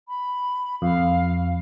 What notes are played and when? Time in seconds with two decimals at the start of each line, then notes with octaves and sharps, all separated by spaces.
0.08 B5
0.82 F2 F5